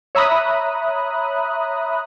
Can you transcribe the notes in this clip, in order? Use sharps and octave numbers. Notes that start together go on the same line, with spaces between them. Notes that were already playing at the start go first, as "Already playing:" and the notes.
C#5 E5 A#5 B5 D#6 F#6